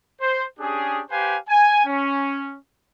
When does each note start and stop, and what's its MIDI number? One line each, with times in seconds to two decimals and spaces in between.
0.21 0.45 72
0.60 1.02 61
0.60 1.02 62
0.60 1.02 67
0.60 1.02 68
1.11 1.37 67
1.11 1.37 71
1.11 1.37 72
1.11 1.37 77
1.11 1.37 80
1.49 1.82 80
1.86 2.56 61